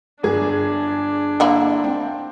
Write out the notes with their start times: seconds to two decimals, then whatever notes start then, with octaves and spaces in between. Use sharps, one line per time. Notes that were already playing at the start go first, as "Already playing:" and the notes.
0.23 G1 D4 G#4
1.40 D3 A#3 E4
1.84 C4